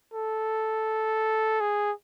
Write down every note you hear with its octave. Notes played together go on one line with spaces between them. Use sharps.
A4
G#4